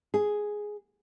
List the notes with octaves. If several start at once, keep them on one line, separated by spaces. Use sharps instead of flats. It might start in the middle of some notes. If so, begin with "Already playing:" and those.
G#4